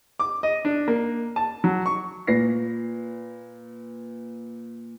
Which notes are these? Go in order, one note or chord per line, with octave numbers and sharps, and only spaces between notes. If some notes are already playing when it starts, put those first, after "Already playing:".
D6
D#5
D4
A#3
A5
F#3
C#6
A#2 B4 A#6 C7